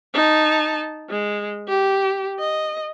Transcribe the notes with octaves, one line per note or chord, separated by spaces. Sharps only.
D#4 A5
G#3
G4
D#5